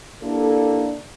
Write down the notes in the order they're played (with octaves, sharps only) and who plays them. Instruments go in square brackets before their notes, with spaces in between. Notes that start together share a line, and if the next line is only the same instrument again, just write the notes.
[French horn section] A#3 D4 E4 G4 A4